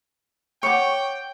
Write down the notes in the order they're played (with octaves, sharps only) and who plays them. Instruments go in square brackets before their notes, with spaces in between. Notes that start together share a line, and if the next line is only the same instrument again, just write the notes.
[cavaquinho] C#5 D6 [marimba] F#5 C#6 [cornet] G5